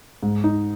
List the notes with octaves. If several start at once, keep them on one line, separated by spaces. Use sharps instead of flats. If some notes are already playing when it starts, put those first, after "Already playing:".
G#2
D#4